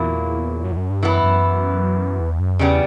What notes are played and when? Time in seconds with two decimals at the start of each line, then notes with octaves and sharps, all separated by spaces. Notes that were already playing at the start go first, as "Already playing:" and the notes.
Already playing: E2 A#2 F#3 A#3 E4
0.64 F#2
0.72 E2
0.77 F#2
0.90 G2
1.03 F#2 E3 B3 E4
1.23 F#2
2.21 E2
2.40 F#2
2.59 E2 C#3 G3 B3